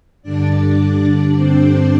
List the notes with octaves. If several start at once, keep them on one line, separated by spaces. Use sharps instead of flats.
G2 D3 D4 D5
C4 C5